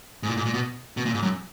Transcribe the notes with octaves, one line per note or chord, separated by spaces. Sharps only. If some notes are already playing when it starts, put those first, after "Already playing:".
G#2
A#2
G#2
A#2
B2
B2
A#2
G#2
F#2